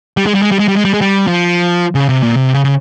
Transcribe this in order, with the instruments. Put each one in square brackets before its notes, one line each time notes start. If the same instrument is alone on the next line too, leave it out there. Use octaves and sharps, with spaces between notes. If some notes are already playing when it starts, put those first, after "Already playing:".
[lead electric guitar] G3
G#3
G3
G#3
G3
G#3
G3
G#3
G3
G#3
G3
F3
C#3
C3
A#2
C3
C#3
C#3